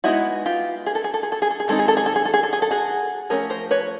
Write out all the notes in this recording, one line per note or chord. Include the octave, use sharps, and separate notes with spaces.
G#3 B3 D#4 E4 F#4
F4 G4
G#4
A4
G#4
A4
G#4
A4
G#4
A4
G#4
D#3 G#3 C4 D#4 A4
G#4
A4
G#4
A4
G#4
A4
G#4
A4
G#4
A4
F#4 G#4
F3 A3 C#4 G#4 A#4
A#4 C5
B4 C#5